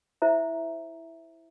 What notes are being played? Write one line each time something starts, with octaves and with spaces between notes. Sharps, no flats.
E4 C5 E5 A#5